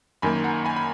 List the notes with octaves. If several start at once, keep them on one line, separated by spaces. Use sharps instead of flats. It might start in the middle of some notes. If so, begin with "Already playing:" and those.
F#2 D#3 A#3 G#5 B5
F#5 A#5
G#5 B5
B5